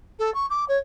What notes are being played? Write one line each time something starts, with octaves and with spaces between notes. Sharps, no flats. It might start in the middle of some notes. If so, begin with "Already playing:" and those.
A4
C#6
D6
C#5